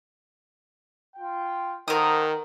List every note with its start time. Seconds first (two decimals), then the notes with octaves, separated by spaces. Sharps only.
1.16 F4 G5
1.88 D#3 A4 A#4 C5 F#5 D#6